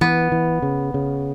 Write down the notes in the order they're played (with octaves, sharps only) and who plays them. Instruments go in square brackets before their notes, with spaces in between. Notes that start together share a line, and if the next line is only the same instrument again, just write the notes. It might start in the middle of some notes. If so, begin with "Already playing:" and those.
[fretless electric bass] E3 [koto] B3
[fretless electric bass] E3
C#3
C#3